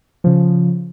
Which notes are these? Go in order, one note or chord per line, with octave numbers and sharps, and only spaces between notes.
C#3 F3